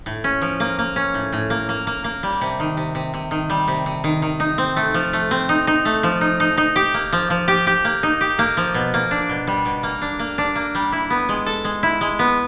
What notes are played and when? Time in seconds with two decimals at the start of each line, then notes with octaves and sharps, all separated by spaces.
0.06 A2
0.24 C#4
0.42 F3
0.60 A#3
0.79 A#3
0.96 C#4
1.14 A2
1.33 A2
1.50 A#3
1.69 A#3
1.87 A#3
2.04 A#3
2.23 G3
2.41 C3
2.60 D#3
2.77 C3
2.95 C3
3.14 C3
3.31 D#3
3.50 G3
3.68 C3
3.86 C3
4.04 D#3
4.22 D#3
4.40 D#4
4.58 C4
4.76 A3
4.94 F3
5.13 A3
5.31 C4
5.49 D#4
5.67 D#4
5.85 A3
6.03 F3
6.21 D#4
6.40 D#4
6.58 D#4
6.76 G4
6.94 A#3
7.13 F3
7.30 F3
7.48 G4
7.67 G4
7.85 A#3
8.03 D#4
8.21 G4
8.39 A#3
8.57 F3
8.74 B2
8.94 A#3
9.11 D4
9.29 B2
9.47 G3
9.65 B2
9.83 A#3
10.02 D4
10.19 A#3
10.38 D4
10.56 A#3
10.75 G3
10.92 E4
11.10 B3
11.29 G#3
11.46 A4
11.65 G#3
11.83 E4
12.01 G#3
12.19 B3